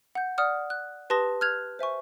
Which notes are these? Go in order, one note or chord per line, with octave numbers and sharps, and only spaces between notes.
F#5 G6
D5 F#5 D#6 F6
F#6
G4 B4 A5 C6 D#6 A#6
F6 F#6 G#6 F7
C5 E5 G#5 C#6